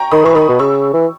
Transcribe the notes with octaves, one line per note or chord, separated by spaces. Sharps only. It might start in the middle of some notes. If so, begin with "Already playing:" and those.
Already playing: G5 A#5 C#6
D#3 B5 D#6
E3 C#6
D#3 B5 D#6
B2
C#3 C#6 E6
E3